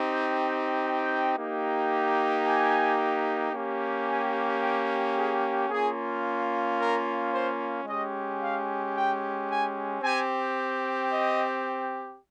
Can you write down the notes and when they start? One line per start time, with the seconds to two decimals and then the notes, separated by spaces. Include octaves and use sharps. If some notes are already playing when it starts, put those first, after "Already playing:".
Already playing: C4 D#4 G4
0.29 G5
0.83 G5
1.37 A#3 D#4 G4
2.45 G#5
3.53 A#3 C#4 G4
4.07 G#5
4.61 G5
5.15 G#4
5.69 A#3 C#4 F4 G#4
6.77 A#4
7.31 C5
7.85 G#3 C#4 G4 D#5
8.39 F5
8.93 G5
9.47 G#5
10.02 C4 G4 G#5
11.10 D#5